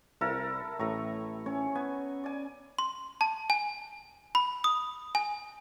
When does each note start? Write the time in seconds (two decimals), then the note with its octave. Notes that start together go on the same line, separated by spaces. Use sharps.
0.21 C2 E4 A4 A#4
0.79 A1 A2 A3 A#5 C#6
1.46 C#4 C#5
1.75 B3 G#5
2.24 D5 G#5
2.79 C6
3.21 A5
3.50 G#5
4.35 B5
4.64 D#6
5.15 G#5